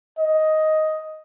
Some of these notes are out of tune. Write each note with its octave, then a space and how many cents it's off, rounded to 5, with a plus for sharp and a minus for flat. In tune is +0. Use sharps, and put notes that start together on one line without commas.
D#5 +5